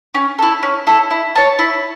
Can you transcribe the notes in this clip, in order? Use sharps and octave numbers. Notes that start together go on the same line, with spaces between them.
C#4
E4 A4
C#4
E4 A4
E4
C#5 A5
E4